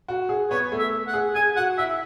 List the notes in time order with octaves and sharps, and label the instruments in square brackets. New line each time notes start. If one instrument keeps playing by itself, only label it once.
[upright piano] F#4
G#4
[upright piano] B3 [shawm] C#5
[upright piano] A3
[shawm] E5
F#5
[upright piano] G#4
[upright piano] G#4 [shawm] G#5
[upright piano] F#4 [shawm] F#5
[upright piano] E4 [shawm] E5